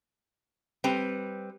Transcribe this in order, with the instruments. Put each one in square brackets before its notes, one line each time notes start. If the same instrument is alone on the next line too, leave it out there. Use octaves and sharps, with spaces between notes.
[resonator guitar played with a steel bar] G3 C4 B4